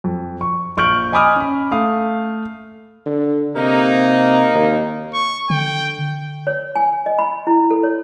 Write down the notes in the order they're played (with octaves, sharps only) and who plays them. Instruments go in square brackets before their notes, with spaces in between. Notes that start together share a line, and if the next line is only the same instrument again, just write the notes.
[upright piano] F2
C#6
A#1 C#6 F6 G6 D7 F#7
D#5 G#5 B5 D6 D#6 F6
C#4 B5
A3 F5 D#6
[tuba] D3
[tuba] C3 [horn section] A#3 D#4
[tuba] D#2
[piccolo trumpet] C#6
[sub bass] D3 [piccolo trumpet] G5
[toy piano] C#5
G#5
D#5
B5
E4
A4
C#5